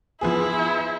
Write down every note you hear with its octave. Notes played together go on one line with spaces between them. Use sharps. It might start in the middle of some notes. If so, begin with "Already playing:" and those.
F3 B3 E4 G#4